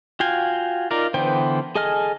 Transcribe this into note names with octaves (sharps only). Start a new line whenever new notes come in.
F4 F#4 F5 G5 G#5
D#4 F4 A#4 D5 F5
D3 E3 B3 C5 G5
G#4 A4 D#5 G#5 F6